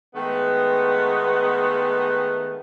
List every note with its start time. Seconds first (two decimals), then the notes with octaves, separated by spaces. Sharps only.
0.14 D#3 G#3 A3 B3